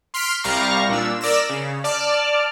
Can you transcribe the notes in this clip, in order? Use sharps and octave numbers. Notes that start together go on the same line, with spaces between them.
C6 F6 B6 C7 D7
C2 G3 F5 A#5 C#6 A#6
A#2 D4 E6
A#4 D5 E6 A#6 E7
C#3
D5 A5 F6